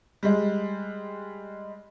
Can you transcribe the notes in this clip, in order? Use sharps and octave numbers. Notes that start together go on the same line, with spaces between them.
G3 G#3